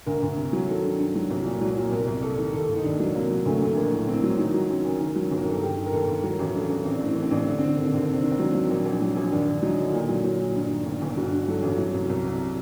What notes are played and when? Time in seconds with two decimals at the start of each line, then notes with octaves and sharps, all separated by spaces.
0.06 D2 A#4
0.22 D2
0.37 C3
0.53 F#3
0.68 D#3 A4
0.84 G2
1.00 G2
1.15 F#3
1.30 C2
1.45 A#2
1.61 F#3
1.77 A#2
1.92 C2 A#4
2.07 C2
2.22 C3 A4
2.38 D#3
2.53 D#2 A4
2.69 D#2
2.76 D#4
2.84 D#2 D4
3.00 F#3
3.15 C3 A#3
3.30 F#3
3.46 D2 A3
3.61 D2 A3
3.77 A#1 A#3
3.92 A2
4.07 A2 C4
4.23 F#3
4.38 D#3 D#4
4.54 F#3
4.69 F#2
4.85 F#1
5.00 D#3
5.16 F#3
5.31 G1
5.37 A#4
5.46 G1 A4
5.62 D#3 G4
5.77 D#3
5.86 A#4
5.92 D#2 A4
6.08 D#2
6.24 F#3 A#4
6.39 A1
6.54 G2 A4
6.70 A1
6.85 A1 C4
6.94 D4
7.01 A2 C4
7.13 A1 D4
7.22 C4
7.31 A1 D4
7.40 C4
7.47 D3 D4
7.58 D3 C4
7.67 D4
7.77 D#2 C4
7.86 D4
7.93 D#2 C4
8.04 D4
8.09 C3 C4
8.23 D#3 D4
8.32 C4
8.39 F#3
8.54 F#3
8.70 A#1
8.86 A#1
9.01 F#3
9.16 A#1
9.32 D#2 D4
9.47 D#2
9.62 F#3 D#4
9.78 D3
9.93 A#2
10.09 F#3
10.24 F#3
10.40 A#2
10.55 G2
10.71 D#3
10.86 G1
11.01 G1
11.17 G2 F#4
11.32 G2
11.48 F#3 A4
11.63 A1
11.78 F#3
11.94 C2
12.09 C2
12.25 C3